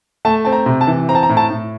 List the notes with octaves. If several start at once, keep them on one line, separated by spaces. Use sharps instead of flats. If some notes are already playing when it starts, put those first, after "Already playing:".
A3 A5
C4 A5
A#5
C3
A5
E3
C4 A#5
A5
A#5
A2
A5
A2